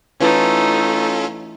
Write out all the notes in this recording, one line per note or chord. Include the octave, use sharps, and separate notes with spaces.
E3 A3 C#4 D#4 F4 A4